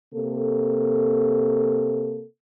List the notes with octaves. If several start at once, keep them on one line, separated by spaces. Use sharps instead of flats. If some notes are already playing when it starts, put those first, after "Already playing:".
C3 A#3 A4